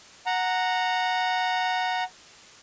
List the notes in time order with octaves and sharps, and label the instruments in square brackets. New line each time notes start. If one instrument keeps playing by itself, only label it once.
[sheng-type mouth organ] F#5 A#5